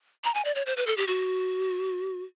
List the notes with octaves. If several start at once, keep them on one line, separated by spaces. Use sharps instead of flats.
A#5
G#5
D5
C#5
C5
B4
A4
G4
F#4